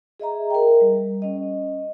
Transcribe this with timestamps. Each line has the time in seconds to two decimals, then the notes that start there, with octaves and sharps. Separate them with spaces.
0.20 G#4 D#5 E5 A#5
0.50 A#4 G5
0.81 G3
1.22 C#4 D#5